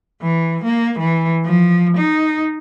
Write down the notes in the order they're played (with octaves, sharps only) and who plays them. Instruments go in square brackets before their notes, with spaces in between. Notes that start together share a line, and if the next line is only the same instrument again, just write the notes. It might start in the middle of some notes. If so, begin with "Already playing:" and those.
[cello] E3
A#3
E3
F3
D#4